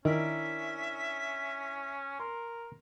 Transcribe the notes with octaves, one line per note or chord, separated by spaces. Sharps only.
D#3 C#4 D4 E4 A#4 E5
A#4 C6